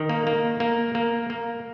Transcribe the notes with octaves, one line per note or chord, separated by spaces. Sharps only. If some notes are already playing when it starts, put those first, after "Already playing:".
Already playing: D#3
A#3
A#3
A#3
A#3
A#3